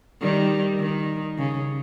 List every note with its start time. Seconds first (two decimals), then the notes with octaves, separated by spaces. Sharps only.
0.22 D#3 G3
0.80 D#3
1.38 C#3